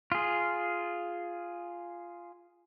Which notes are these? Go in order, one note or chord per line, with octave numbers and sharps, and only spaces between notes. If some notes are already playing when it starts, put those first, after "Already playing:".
F4 G#4